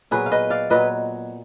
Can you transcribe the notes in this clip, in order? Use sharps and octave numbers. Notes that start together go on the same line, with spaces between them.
A#2 F#3 B3 G#4 B4
F5
B4 D#5
D5 F5
A#2 F#3 B3 B4 D#5